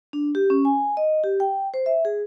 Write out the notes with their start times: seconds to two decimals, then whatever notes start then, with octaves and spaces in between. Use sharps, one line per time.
0.13 D4
0.35 G4
0.50 C#4
0.65 G#5
0.97 D#5
1.24 G4
1.40 G5
1.74 C5
1.86 E5
2.05 G#4